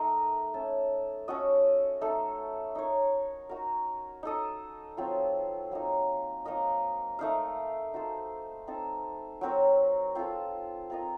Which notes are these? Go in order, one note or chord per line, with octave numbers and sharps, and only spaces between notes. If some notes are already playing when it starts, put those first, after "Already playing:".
Already playing: A3 D#4 A#4 D#5
A3 C#4 A4
C#4 F#4 A4 D#5
A3 D#4 A4
D#4 A#4 C#5
D#4 F#4 A#4
D#4 A4 D#5
F#3 C4 F4
F#3 A#3 D#4
A#3 D#4 A#4 D#5
A3 D#4 A#4 F5
D#4 F#4 A4 C5
C4 D#4 A4
F#3 C4 F#4 A#4
C4 F4 A4
C4 F4 A#4 D#5